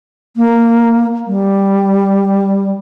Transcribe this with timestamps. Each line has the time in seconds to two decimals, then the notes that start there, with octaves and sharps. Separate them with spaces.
0.37 A#3
1.27 G3